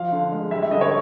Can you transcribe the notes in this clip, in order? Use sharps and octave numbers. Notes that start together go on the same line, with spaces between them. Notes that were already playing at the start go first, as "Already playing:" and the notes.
Already playing: F3 F5
D3
G#3
G3 E5
E5
D3 D#5
C#5